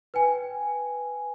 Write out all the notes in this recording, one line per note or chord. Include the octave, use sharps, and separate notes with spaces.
B4 G5 G#5